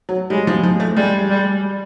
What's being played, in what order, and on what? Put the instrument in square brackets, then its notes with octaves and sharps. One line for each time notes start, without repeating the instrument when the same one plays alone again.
[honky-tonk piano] F#3
[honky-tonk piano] G3 [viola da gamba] G#3
[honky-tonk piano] F3
F3
A3
[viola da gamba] G3 [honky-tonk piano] G#3
[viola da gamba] G3